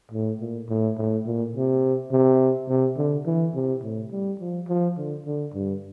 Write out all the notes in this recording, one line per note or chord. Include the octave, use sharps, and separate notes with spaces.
A2
A#2
A2
A2
A#2
C3
C3
C3
D3
E3
C3
A2
G3
F3
F3
D3
D3
G2